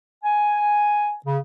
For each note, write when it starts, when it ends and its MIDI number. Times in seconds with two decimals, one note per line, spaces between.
0.23 1.13 80
1.25 1.38 49